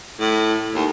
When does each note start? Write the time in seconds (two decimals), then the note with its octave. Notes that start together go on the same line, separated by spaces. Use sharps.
0.20 A2
0.74 D#2